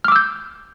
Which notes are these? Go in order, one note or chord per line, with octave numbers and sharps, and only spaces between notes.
D6 E6 F6 G6